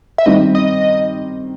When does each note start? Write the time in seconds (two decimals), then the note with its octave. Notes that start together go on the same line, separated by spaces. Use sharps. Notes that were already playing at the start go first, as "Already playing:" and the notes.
0.18 E5
0.26 D#3 G3 C4 D#5
0.55 D#5